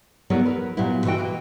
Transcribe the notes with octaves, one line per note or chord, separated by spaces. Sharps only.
F#3 G3 B3 E4 A#4 C#5
A#4 B4
A#2 F#3 G3 B3 E4
E3 F#4 D#5 G5
A#3 B4